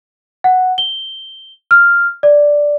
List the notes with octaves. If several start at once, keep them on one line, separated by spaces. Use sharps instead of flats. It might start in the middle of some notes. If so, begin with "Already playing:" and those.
F#5
G7
F6
D5